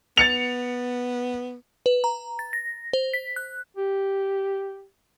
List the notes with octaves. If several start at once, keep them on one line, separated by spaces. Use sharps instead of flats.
B3 A6 C#7 F7
B4
A#5
A6
A#6
C5
B6
F#6
G4